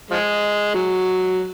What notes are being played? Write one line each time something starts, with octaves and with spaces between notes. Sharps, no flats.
F3 G#3
F#3